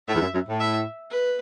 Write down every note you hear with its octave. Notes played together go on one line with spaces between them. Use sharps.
A2 E5
E2
F#2
F#2
A2
E5
B4